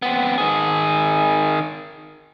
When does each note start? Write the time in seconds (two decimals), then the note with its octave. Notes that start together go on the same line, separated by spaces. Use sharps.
0.02 B3 C4
0.38 D#3 G#4